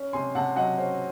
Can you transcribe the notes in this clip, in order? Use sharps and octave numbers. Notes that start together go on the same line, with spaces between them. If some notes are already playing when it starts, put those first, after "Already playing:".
Already playing: C#4
C3 G#5 C6
C3 F#5 A5
F#3 D#5 F#5
C#4 C5